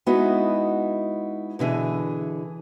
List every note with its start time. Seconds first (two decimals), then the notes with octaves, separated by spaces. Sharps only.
0.06 G#3 B3 D#4 E4 F#4
1.59 B2 D3 E3 G#4